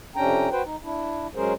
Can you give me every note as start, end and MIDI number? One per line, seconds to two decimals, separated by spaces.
0.16 0.49 41
0.16 0.49 48
0.16 0.49 61
0.16 0.49 62
0.16 0.49 79
0.16 0.49 82
0.52 0.62 66
0.52 0.62 71
0.52 0.62 72
0.52 0.62 79
0.64 0.76 63
0.84 1.27 62
0.84 1.27 64
1.35 1.53 54
1.35 1.53 56
1.35 1.53 61
1.35 1.53 68
1.35 1.53 70
1.35 1.53 72